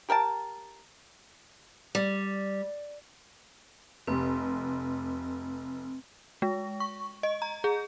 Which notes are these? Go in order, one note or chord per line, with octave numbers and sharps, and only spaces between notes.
G4 A#4 G5 A5
G3
F1 C4 G4
G#3
C#6
D#5
A#5
G#4